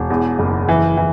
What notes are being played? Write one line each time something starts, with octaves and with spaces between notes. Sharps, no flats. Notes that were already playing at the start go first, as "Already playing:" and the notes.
Already playing: E1
E2
F#1
E3
E3